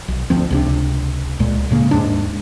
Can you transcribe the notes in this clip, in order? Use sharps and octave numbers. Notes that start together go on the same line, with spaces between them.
B1
G#1 D2 F3 C4
C#2 C3 D4
C#2 A#2 G#3
A2 C#3 A#3
D#2 G#2 G#3 D4